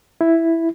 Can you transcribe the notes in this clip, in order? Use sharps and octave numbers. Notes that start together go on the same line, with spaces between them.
E4